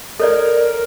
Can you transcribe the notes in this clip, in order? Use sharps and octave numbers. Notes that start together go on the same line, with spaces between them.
A4 A#4 C#5 D5